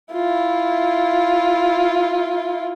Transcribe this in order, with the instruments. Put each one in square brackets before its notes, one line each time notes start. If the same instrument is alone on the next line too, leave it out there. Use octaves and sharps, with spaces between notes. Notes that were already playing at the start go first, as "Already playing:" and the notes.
[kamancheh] E4 F4